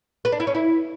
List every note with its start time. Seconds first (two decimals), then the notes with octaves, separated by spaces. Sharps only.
0.25 B4
0.32 D4
0.40 E4
0.47 C#4
0.55 E4